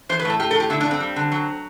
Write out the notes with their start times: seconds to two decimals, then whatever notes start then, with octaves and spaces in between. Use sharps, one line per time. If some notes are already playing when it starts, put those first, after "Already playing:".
0.09 E3 C5
0.19 B4
0.25 A2 A4
0.40 A2 G4
0.51 A4
0.55 A2 G4
0.70 D3 E4
0.81 D4
0.85 G2
0.91 C4
1.00 G3
1.16 D3
1.32 F#3